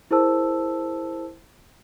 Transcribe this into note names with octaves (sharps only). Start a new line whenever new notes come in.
E4 G#4 A#4 C5 A5 E6